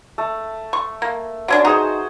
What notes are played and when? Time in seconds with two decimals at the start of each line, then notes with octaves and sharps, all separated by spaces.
0.18 A3
0.73 C#6
1.02 A#3
1.48 D3 C#4 D4 F#4
1.65 D#4 F#4 G#4 C5